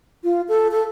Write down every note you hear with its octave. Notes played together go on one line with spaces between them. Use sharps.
F4
A4
A4